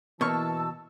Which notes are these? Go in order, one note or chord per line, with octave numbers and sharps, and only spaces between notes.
B2 E3 A#3 A5 C#6 E6 F6